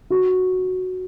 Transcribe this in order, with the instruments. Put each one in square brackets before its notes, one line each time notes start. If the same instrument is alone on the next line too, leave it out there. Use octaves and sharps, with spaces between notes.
[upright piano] F#4